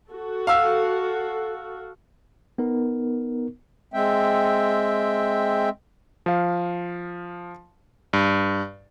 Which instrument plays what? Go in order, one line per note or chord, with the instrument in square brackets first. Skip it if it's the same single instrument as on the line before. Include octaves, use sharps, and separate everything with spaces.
[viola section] F#4 A4
[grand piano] F5 E6
[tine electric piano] B3 D#4 A#4
[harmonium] G#3 C4 E5 G5
[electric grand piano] F3 F5
G2